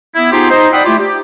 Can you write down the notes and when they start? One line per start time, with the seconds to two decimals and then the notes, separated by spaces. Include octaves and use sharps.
0.16 B3 E4
0.32 B3 D#4 F4 G4 G#4 C5
0.51 D#4 C5 D#5
0.73 D5 F#5 G5 B5 D#6 E6
0.85 A3 E4 F4 G4
0.99 G4